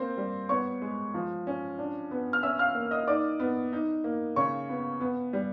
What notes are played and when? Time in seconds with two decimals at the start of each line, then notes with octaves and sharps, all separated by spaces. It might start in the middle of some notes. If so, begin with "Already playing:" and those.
Already playing: A#3 C4 C5
0.17 G3
0.49 B3 C#5 C#6
0.82 G#3
1.14 F3
1.47 C#4
1.79 D4
2.11 B3
2.33 F6
2.43 C#4 E5 E6
2.59 F5 F6
2.75 A#3
2.91 D#5 D#6
3.08 D#4 D5 D6
3.40 B3
3.73 D#4
4.04 A#3
4.36 C#3 C#5 C#6
4.69 B3
5.01 B3
5.33 G3